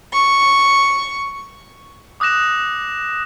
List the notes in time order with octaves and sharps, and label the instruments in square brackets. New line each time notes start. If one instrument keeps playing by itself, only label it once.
[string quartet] C#6
[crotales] D6 D#6 F#6 A#6 E7